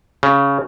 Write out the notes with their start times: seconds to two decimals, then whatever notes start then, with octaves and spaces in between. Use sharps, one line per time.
0.23 C#3